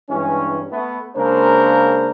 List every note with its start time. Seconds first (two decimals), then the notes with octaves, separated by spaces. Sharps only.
0.10 G2 E3 G#3 C#4
0.71 A3 B3
1.16 C#3 G#3 A#3 D4 A#4 C5